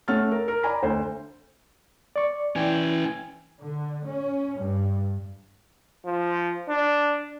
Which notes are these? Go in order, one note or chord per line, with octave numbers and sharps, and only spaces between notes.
A3 C#4 F#5 F6 A6
A#4
A#4
D5 G#5 A#5 B5
D2 C5
D5 C#6
E3 C#4 G5 G#5
D3
C#4
G2
F3
D4